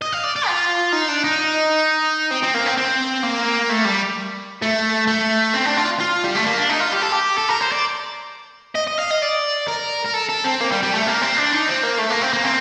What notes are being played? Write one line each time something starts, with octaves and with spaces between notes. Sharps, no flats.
D#5
F5
D5
D5
F4
D#4
D4
D#4
C4
C4
A#3
C4
C4
A#3
A3
G3
A3
A3
C4
D4
F4
F4
G3
A3
A#3
D4
D#4
F4
G4
A4
G4
A4
A#4
C5
D5
D#5
D#5
F5
D#5
D5
A#4
A#4
A4
A4
C4
A#3
G3
G3
A3
A#3
C4
D4
D#4
C4
A#3
A3
A#3
C4
A#3
C4